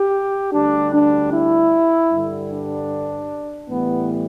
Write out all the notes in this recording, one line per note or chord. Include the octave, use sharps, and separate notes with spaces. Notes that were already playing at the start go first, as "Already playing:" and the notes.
Already playing: G4
D2 D3 G3 D4
D4
E4
G2 D3 G3
D4
A2 E3 G3 B3